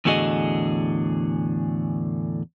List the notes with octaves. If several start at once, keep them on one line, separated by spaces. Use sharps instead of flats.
E2 A2 D3 F#4 G#4 D#5